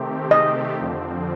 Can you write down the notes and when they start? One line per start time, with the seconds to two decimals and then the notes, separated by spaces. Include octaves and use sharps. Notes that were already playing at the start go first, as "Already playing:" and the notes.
Already playing: C3 D#3 A3 C4 G4
0.31 D#5
0.76 F2 D3 F3 C4